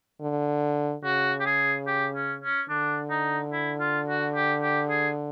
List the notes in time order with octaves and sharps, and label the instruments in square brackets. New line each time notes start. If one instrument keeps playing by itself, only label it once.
[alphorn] D3
[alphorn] C#3 [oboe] F#4
[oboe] G4
G#4
G4
C#4
C#4
[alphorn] D3 [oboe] D4
[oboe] D#4
E4
F4
F#4
G4
G4
G#4